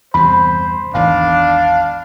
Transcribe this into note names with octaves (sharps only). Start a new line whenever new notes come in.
E2 G2 C3 C5 B5
G#1 E2 D#3 D4 F5